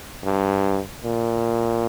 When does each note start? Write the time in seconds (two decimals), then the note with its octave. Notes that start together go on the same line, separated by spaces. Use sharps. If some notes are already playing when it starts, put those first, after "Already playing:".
0.25 G2
1.04 A#2